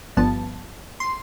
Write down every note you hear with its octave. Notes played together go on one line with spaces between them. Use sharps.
G1 G2 F3 B3 A5
C6